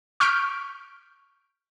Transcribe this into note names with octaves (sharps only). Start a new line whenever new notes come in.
C#6 F6 G6 B6 D7